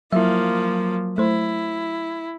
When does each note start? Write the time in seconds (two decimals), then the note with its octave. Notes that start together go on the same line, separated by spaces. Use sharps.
0.12 F3 F#3 A#3 E4 E5
1.18 A3 E4 C5